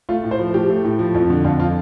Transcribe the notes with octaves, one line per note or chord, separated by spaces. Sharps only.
A3 F4
A2
C5
F3
A2 G4
A3
A2
F3
F2
D3
F2 F4
F3 F4